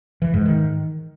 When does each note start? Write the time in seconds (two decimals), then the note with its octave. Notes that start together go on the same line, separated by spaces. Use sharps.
0.22 E3
0.34 G#2
0.46 D#3